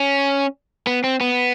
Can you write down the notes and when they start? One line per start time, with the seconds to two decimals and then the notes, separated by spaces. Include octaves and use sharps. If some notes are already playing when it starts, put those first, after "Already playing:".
Already playing: C#4
0.87 B3
1.04 C4
1.21 B3